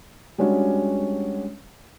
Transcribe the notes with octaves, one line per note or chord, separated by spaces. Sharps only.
G3 G#3 C#4 D4 F#4